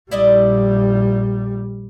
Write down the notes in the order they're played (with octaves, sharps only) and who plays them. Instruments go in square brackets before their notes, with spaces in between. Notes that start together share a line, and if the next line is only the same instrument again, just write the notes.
[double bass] A#1 G3 [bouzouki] E4 D5 D#5